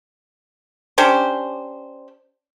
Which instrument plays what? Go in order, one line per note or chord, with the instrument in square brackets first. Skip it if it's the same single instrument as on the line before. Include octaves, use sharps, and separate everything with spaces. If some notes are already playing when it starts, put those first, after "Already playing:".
[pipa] C#4 D4 G4 C5